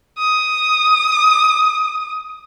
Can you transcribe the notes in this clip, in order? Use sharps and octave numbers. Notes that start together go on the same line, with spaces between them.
D#6